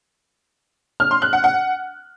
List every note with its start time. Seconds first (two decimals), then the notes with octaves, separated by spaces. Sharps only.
1.00 F6
1.11 C6
1.22 F#6
1.33 F#5
1.44 F#5